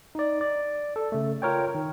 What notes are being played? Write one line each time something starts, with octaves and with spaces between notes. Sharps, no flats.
D#4 D5
D5
A4
C#3 A3
F4 A#4 C#5 G5
D#3